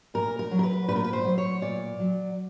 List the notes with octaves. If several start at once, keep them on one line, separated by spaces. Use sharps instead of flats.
A#2 A#4
A#4
F#3
A#4
B4
A#2 B4
A#4
B4
C5
F#3
C#5
A#2 D5
F#3